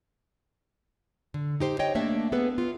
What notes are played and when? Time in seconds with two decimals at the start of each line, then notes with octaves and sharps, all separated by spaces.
1.34 D3
1.60 D#4 G4 C5
1.79 C#5 D#5 G5
1.95 A3 A#3 D4 D5 E5
2.32 B3 G#4 A4 B4
2.58 F4